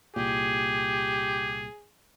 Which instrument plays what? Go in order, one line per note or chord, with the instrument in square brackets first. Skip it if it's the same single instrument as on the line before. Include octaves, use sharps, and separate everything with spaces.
[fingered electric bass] C2 A#2 [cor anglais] G4 [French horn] G#4